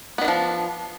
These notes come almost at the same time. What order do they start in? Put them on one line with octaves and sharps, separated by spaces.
B3 D#3 D4 F3